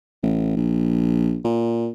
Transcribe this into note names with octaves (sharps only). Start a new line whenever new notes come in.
A1
A#1
A#2